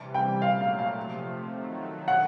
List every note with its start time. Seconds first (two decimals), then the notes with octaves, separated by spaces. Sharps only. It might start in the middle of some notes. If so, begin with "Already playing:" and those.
Already playing: C3 E3 G3
0.14 G5
0.41 A#2 F#3 A3 F5
0.61 F5
0.79 F5
0.97 C3 F3 A3
1.52 D#3 F#3 A3
2.08 F#5